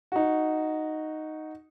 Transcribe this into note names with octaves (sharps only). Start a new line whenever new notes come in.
D#4 F#4